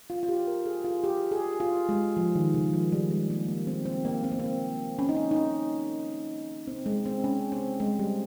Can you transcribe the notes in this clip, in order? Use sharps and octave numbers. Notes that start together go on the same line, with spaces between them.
F4
F4
G4
A#4
G#4
F4
G4
G#4
F4
G#3
F3
D#3
C#3
F3
G3
G#3
A#3
A#3
C4
C4
A#3
C4
A#3
C4
C#4
D#4
C#4
D#4
C#4
C4
G#3
C4
C#4
C4
G#3
G3